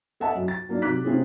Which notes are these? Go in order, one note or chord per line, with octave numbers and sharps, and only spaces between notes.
A4 D#5 E5 F#5 G#5 A5
F#2 F#3
A6
F#3 A#3 D4 D#4
C3 F#3 D6 F#6 B6
A2 C3 C4 C#4 F4 G#4